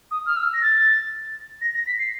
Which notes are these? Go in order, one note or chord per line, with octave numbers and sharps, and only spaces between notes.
D#6
F6
E6
A#6
A6
A#6
A#6
B6
C7